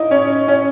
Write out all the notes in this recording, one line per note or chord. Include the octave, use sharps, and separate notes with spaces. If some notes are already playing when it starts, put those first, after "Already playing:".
Already playing: D#4 E4 D#5
C#4 C#5
C#4 C#5